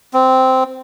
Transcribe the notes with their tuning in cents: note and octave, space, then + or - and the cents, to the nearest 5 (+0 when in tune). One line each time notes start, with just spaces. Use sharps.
C4 -10